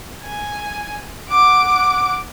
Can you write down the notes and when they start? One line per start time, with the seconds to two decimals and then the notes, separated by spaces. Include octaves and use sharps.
0.23 G#5
1.29 F#5 D6